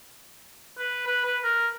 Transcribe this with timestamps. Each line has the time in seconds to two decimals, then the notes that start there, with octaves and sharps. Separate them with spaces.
0.79 B4
1.07 B4
1.25 B4
1.44 A#4